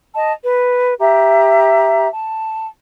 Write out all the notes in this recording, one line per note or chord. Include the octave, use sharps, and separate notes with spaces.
D#5 A5
B4
G4 E5 A#5
A5